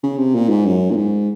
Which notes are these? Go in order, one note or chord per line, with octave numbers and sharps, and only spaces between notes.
C#3
C3
A#2
G#2
F#2
A#2
G#2